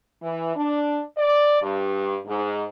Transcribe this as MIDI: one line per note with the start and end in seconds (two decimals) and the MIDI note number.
0.22 0.52 52
0.55 1.00 62
1.18 1.58 74
1.62 2.17 43
2.26 2.64 44